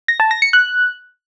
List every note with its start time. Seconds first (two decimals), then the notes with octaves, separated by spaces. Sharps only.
0.08 A#6
0.20 A5
0.31 A#6
0.42 C#7
0.53 F#6